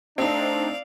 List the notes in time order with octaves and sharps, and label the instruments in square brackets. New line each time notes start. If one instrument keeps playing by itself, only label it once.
[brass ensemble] A3 D4 [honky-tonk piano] C4 D#4 [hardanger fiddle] D5 F5